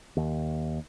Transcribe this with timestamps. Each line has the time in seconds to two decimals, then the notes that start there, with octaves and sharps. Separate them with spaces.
0.17 D#2